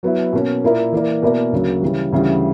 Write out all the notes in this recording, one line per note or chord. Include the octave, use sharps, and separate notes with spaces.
F#3 B3 E4
B2 A#3 C#4
A#2 A#3 E4 A#4 D5
E3 A#3 E4 A#4 D5
B2 A#3 E4 A#4 D5
D2 C#3 F#3 A#3
C#3 E3 G3
D2 C#3 E3 G3